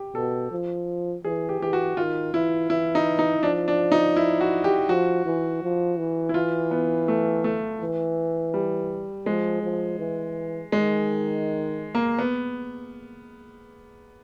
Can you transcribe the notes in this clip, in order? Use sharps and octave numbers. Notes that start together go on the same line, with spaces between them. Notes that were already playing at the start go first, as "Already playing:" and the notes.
Already playing: G4
B2 A4
F3
E3 G#4
G4
E3 G4
F#4
D#3 F4
E3 E4
E3 E4
D#4
D#4
F3 D4
D4
D#4
E4
F#4
G4
F3 F#4
E3
F3
E3
E4
E3 F4
B3
A3
A3
E3
G3
F3 G#3
F3
E3
D#3 G#3
A#3
B3